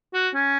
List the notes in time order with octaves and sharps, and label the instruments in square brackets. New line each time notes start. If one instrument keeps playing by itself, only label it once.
[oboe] F#4
C#4